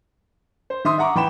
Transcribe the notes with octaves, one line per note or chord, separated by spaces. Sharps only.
C5
D#3 E5 C6 D#6
E5 F#5 A#5 C#6 D6
E3 G5 B5 E7